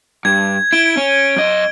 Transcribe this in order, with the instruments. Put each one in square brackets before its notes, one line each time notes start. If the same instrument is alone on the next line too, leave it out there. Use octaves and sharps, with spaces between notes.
[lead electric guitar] G2 [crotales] G#6
[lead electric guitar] E4 [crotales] D7 G7
[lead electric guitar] C#4
F#2 D#5